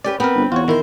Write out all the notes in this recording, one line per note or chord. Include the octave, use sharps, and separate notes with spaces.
C#4 G4 B4 D5
B3 C4 A#4 B4
G1
E2 F4 F#4 C#5
D#3 E4 A#4 C5